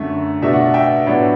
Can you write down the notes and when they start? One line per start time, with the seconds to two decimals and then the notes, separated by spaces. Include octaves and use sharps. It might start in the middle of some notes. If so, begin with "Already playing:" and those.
Already playing: F#2 D3 A3 E5
0.42 B2 A3 D4 E5
0.53 F#5
0.64 F#5
0.74 E5 G5
1.06 A2 F#3 B3 D4